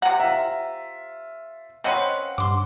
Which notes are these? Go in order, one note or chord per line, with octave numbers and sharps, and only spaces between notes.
C3 F#5 A#5
F4 E5
C4 C#4 B4 D#5 F5 F#5 C6
G2 C6 D6